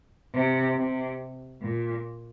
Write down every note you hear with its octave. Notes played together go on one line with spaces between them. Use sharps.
C3
C3
A#2